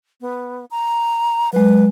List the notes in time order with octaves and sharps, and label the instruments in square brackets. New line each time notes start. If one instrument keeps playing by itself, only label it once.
[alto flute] B3
A#5
[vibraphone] F#3 G#3 [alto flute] B4